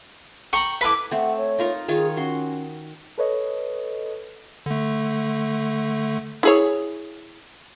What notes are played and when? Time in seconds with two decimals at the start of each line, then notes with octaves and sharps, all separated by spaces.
0.53 G5 A#5 B5 C#6
0.81 E4 A4 B4 B5 D6
1.11 A3 C4 F#5
1.37 C#5
1.59 D#4 F4 A#4
1.88 D#3 F4 G#4 C#5
2.17 C#4 F#4 C6
3.18 A4 B4 C#5 D#5
4.66 D3 A3
6.43 E4 G#4 C#5